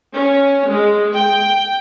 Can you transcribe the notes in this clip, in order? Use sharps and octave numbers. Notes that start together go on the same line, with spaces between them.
C#4
G#3
G5